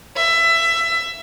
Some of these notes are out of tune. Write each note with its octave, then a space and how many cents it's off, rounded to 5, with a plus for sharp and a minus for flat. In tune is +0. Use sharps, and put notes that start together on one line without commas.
E5 +20